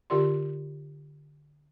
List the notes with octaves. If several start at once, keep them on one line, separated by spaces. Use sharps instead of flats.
D3 F4 G4 D5 C6